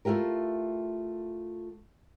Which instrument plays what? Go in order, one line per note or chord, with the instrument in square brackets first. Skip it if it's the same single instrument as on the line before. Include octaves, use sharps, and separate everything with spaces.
[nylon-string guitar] A3 E4 F4 G4 A#4